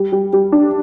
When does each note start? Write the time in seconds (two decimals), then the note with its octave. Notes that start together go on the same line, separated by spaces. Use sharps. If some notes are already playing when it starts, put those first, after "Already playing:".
Already playing: G3
0.12 G3
0.33 G3
0.52 D4